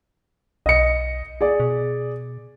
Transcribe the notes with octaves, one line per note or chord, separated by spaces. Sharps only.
B1 D#5 C#7
G#4 D5
B2